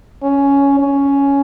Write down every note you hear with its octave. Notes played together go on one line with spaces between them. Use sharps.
C#4
C#4